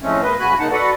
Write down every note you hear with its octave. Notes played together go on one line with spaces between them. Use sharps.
A2 F3 G#3 A3 C4 C#4
G#3 A#3 B4 D#5
G2 C#3 F#4 G#5 B5 F#6
C#3 A#3 D#4 F#5 A5
F#4 A4 B4 D5 F#5